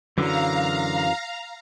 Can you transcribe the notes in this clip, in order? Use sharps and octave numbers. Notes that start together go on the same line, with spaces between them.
F#2 D3 E3 F#3 F5 A#5